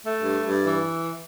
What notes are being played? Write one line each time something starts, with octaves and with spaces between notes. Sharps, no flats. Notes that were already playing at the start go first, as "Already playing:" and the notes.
A3
G2
G2
E3